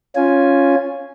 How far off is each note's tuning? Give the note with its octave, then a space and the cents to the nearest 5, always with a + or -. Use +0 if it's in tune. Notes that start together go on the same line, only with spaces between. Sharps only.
C#4 +0 F4 +0 G#5 +0